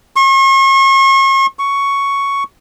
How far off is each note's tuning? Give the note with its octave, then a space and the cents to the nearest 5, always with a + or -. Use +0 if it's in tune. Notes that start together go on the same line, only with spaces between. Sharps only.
C#6 -40
C#6 +5